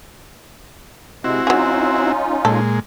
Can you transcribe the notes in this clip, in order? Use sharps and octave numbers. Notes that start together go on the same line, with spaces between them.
C3 G#3 C4 E4 F#4
F#3 C#4 D#4 F4 G#4
A#2 G#3 A4